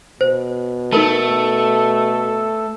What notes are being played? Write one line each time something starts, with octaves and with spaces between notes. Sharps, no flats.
B2 C5
A3 D#4 A4 A#4 A5